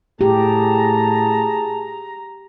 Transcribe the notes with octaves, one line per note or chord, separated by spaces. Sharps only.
A2 G4 G#4 A5 A#5